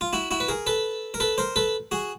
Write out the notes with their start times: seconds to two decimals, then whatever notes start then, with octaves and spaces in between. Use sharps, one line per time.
0.01 F4
0.13 E4 F#4
0.31 E4 F#4
0.40 B4
0.48 G#4 A#4
0.67 A4 B4
1.14 A#4
1.20 A4 B4
1.38 A#4 C5
1.56 A4 B4
1.91 F#4 G#4